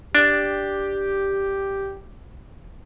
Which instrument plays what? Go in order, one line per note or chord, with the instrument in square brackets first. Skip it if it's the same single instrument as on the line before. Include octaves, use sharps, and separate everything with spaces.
[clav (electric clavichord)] D4 [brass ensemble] G4